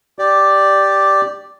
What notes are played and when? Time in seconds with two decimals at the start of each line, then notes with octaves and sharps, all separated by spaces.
0.19 G4 D5